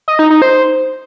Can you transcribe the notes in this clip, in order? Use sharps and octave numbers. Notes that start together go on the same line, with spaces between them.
D#5
D#4
D#4
C5